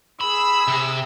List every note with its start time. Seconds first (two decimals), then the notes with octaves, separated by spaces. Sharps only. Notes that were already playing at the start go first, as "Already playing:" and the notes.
0.21 G#4 B5 E6
0.68 C3